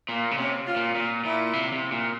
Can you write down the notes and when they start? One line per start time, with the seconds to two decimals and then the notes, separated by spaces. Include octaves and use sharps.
0.09 A#2 A#3
0.31 C#3
0.38 C3 C#4
0.67 F4
0.76 A#2
0.95 A#2 F4
1.24 A#2 E4
1.53 C3
1.72 C3
1.92 A#2